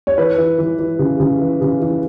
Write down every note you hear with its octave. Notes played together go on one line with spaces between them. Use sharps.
C#5
E3 B4
E3
E3
E3
C#3
C#3
E3
C#3
E3